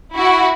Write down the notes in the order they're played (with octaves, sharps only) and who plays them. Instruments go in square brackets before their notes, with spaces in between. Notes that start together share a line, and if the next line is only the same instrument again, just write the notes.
[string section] E4 F#4